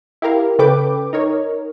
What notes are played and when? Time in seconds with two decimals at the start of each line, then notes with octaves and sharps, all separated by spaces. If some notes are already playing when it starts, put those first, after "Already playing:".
0.22 E4 G4 A#4 F5
0.59 C#3 C#4 A4 B4 G5 D6
1.13 D#4 A#4 C#5